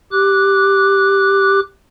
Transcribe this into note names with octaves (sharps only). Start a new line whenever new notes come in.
G4 D6 F#6